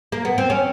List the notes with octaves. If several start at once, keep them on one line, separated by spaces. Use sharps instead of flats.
A#3
B3
C4
C#4